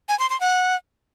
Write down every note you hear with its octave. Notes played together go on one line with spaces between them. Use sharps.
G#5
C6
C6
F#5